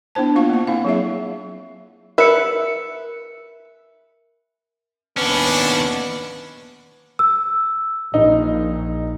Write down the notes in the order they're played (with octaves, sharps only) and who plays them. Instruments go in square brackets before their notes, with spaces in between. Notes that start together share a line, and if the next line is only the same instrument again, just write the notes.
[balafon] B3 D4 E4 C5 A5
A#3 F4 F5 C#6
A#3 F#5
C4 E4 F5
F#3 G#4 E5
[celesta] A#4 C#7 [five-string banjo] B4 E5
[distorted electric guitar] D#2 C#4 [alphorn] B3 [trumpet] D4
[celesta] E6
[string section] A#1 [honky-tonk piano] D#4